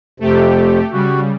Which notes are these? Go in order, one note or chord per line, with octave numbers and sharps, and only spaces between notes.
F2 C3 A3 G4
C#3 G3 F#4